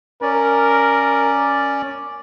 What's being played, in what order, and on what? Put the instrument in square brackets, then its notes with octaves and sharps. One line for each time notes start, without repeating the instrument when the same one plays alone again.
[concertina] C#4 D5 [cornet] A#4